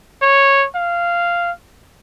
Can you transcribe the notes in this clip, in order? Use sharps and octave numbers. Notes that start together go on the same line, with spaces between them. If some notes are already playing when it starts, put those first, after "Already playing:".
C#5
F5